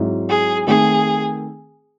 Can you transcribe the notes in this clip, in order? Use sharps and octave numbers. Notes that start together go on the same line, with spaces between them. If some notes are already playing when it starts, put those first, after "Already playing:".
Already playing: G#2 F#3 C4 E4
G#4
D#3 A3 C4 G#4